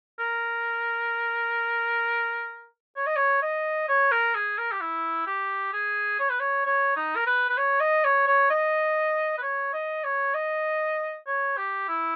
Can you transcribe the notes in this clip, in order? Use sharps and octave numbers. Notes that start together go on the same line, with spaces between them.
A#4
C#5
D#5
C#5
D#5
C#5
A#4
G#4
A#4
G4
E4
G4
G#4
C#5
B4
C#5
C#5
D#4
A#4
B4
B4
C#5
D#5
C#5
C#5
D#5
B4
C#5
D#5
C#5
D#5
C#5
G4
E4